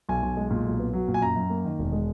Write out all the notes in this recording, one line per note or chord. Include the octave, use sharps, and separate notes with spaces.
B1 G#5
B1
G#3
A#2
B1
B3
F#3
A#2
G#5
F#2 A#5
F#2
A#3
D#3
E1
G#3